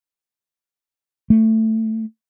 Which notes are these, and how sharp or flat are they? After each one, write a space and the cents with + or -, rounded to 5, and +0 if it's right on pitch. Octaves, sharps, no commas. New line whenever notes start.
A3 +10